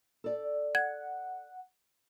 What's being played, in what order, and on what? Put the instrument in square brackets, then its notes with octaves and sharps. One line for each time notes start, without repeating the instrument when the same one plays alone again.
[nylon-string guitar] A4 D5
[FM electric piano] F#5 [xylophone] G#6